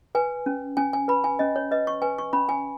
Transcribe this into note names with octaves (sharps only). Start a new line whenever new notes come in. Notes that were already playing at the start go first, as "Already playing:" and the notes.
B4 G#5
C#4
C#4 G#5
G#5
B4 B5
G#5
C#4 D#5
C#5
B4 D#5
C#6
B4 G#5
C#6
C#4 B5
G#5